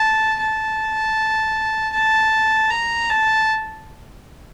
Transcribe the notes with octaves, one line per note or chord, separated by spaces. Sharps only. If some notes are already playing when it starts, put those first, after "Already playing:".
Already playing: A5
A5
A5
A#5
A5